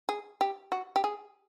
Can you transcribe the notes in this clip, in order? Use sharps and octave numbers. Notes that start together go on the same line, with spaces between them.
G#4
G4
F#4
G4
G#4